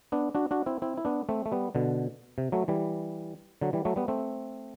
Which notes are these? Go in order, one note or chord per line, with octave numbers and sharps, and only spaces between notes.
B3 D4
D4 F#4
D4 F#4
C4 E4
C4 E4
E4
B3 D4
A3 C4
A3
G3 B3
B2 D3
C3
F#3 A3
E3 G3
D3 F#3
E3 G3
F#3 A3
G3 B3
A3 C4